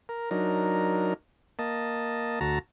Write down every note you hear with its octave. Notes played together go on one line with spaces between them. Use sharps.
A#4
F#3 D4 D#4 A#4
A#3 D#5 A5
D2 F#4 A5 A#5